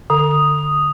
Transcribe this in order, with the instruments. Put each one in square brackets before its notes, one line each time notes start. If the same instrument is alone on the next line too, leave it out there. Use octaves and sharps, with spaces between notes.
[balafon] D3 [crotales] D#6